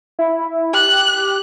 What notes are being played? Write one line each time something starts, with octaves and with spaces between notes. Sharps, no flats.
E4
G4 F#6